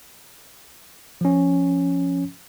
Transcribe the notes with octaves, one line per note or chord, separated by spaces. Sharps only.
F3 C#4